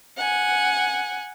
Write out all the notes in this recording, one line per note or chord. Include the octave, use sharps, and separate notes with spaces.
F#5 G#5